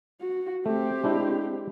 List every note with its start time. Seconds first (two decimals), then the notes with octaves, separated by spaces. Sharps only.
0.21 F#4
0.66 A3 C4 G4
1.04 G#3 D4 E4